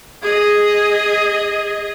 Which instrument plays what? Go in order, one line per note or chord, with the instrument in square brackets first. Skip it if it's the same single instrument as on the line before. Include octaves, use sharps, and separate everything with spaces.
[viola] G#4 D#5